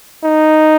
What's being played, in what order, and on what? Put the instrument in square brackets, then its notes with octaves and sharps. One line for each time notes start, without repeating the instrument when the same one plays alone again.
[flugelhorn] D#4